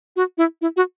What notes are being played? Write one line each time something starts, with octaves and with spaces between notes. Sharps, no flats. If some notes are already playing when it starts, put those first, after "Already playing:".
F#4
E4
E4
F#4